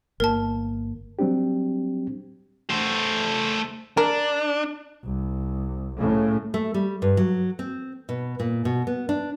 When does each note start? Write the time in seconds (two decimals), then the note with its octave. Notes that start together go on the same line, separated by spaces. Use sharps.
0.20 G1 A#3 A#4 A5
1.19 F#3 G3 C4 D4 G4
2.70 A3 C5
3.97 D4 A#4
5.06 C2
5.98 A2 C#3
6.54 A3
6.74 G3
7.02 G2
7.17 F#3
7.59 C4
8.09 B2
8.40 A#2
8.65 B2
8.87 B3
9.09 D4